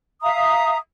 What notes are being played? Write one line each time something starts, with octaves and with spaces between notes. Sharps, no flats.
E5 F5 A#5 D#6